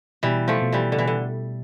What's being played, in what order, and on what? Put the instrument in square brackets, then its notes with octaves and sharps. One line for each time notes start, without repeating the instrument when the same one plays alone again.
[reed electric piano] B2 [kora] E3 G3
[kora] F3 A3
[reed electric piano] B2
[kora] E3 G3
D3
[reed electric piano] B2 [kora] E3
[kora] D3